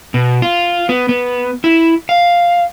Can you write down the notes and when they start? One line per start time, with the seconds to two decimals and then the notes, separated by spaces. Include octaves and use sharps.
0.14 B2
0.42 F4
0.89 B3
1.09 B3
1.64 E4
2.09 F5